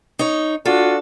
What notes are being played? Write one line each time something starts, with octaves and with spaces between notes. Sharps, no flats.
D#4 C#5
D4 F4 F#4 A4